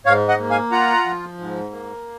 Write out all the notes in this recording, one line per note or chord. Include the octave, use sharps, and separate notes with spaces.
G#2 C#5 F5
D#5 F#5
A#3
F5 G#5
F4 F#5 A#5
F3
G#2
A#3